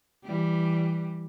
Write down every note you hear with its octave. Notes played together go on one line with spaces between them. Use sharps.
E3 G3